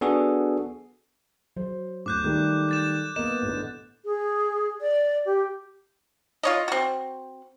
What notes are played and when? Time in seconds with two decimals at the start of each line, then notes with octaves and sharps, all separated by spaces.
0.01 B3 D4 F#4 G#4 A4
1.56 F#3 C5
2.06 D1 D6 F#6 G6
2.24 D#3 G3 A3
2.69 G6 A6 E7
3.16 A#3 B3 D#5 E7
3.42 A1 D3
4.04 G#4
4.80 D5
5.25 G4
6.43 F4 C#5 D#5
6.68 C4 F#4